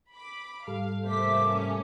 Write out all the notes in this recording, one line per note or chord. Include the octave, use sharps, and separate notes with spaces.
B5 D6
G#2 G3 A4 F5
C3 A3 A#3 C5 E5 D6 B6
C#4